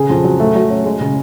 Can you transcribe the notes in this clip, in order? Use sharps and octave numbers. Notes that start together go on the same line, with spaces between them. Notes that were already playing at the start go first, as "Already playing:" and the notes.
Already playing: C#3 G#4
F2
F#3
A3
F#3
C#4
G#3
C#3